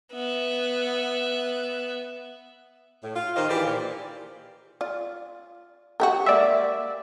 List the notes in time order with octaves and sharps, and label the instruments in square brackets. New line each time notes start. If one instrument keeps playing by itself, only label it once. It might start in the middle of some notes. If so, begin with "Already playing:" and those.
[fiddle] B3 E5
[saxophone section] A2
F4
D#3 F4 G4 C5 D#5
E3 G4 G#4 C5 D5
A#2
[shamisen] F4 D5
F#4 G4 A#4
[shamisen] G#3 A#3 [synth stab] D5 E5